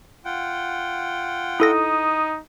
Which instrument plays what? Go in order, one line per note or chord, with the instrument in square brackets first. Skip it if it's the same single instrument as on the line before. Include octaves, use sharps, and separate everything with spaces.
[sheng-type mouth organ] F4 F#5 G5
[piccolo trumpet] D#4 [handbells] E4 A4 A#6 [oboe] D#6